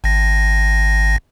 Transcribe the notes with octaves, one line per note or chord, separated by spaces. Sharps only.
G#1 A#6